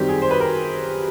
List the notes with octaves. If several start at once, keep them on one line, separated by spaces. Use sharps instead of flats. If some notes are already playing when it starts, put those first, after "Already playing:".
Already playing: F#2 D#3 G3 C4 G4
G#4
C5
B4
A#4